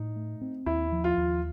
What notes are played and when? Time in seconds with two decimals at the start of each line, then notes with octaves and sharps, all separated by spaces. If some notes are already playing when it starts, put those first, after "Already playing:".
Already playing: A2 D#4
0.16 A3
0.41 C4
0.66 D#2 E4
0.92 F3
1.04 F4
1.17 D#2